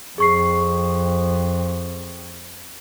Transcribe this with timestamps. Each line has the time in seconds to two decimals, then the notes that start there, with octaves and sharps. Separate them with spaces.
0.18 F2 G#4 C#6 C7